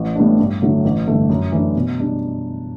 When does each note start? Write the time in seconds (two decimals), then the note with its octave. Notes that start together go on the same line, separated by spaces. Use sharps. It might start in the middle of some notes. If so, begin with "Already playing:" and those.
Already playing: A1
0.15 A2 G3 B3 D4
0.39 G2
0.62 D3 F#3 A3 E4
0.85 A1
1.08 G2 D3 A3
1.30 F#2
1.52 E3 A3 D4
1.76 B2
1.98 G3 D4